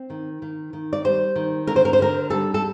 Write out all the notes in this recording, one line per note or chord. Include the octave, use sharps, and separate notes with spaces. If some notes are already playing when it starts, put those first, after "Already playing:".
Already playing: C4
D#3
D#3
D#3
D5
G3 C5
D#3
D3 A#4
C5
A#4
C5
D3 A#4
G3 A4
A4